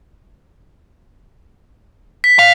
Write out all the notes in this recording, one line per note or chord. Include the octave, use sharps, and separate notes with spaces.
B6
F5 B6